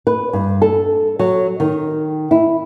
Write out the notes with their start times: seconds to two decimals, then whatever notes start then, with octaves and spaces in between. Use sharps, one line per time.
0.07 B4
0.33 G2
0.62 A4
1.19 F#3
1.60 D#3
2.31 E4